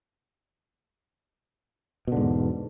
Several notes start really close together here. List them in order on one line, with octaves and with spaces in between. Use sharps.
B2 D3 G#2 E2